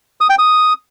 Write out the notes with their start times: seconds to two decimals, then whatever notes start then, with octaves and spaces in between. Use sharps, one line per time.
0.21 D#6
0.30 G5
0.39 D#6